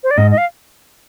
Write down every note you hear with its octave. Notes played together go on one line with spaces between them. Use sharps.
C5
D5
G#2 D#5
D#5
F5